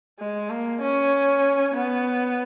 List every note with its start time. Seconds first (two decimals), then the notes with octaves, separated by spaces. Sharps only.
0.19 G#3
0.50 A#3
0.82 C#4
1.74 B3